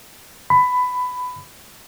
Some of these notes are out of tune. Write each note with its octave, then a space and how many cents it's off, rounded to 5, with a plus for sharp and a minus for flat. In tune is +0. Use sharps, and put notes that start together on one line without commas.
B5 +15